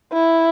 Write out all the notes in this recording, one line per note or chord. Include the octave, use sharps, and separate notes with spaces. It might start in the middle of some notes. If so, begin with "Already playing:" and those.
E4